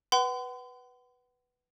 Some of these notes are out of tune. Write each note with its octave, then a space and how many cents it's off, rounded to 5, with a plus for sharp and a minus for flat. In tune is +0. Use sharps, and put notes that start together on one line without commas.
B4 +0 F#5 +35 C6 -45